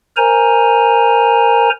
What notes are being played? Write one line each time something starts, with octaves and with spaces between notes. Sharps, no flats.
A#4 C5 G#5 A#5